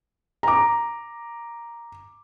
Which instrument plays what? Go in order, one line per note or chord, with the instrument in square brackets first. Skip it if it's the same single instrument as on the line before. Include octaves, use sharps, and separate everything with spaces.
[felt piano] A#5 D6